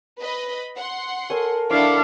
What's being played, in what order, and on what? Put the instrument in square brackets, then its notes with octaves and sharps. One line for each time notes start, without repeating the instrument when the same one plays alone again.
[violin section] B4 D#5 B5
F#5 C6
[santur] A4 C#5 G#5 [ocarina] A#4
[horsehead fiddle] D4 F5 [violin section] E4 A4 F#5 [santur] A5 C#6 D6